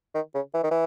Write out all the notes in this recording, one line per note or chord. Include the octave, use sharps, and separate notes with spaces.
D#3
C#3
E3
D#3
E3